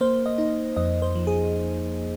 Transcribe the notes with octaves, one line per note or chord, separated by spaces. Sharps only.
A#3 C5
D#5
D#4
F2 D#5
C5
F3
G#4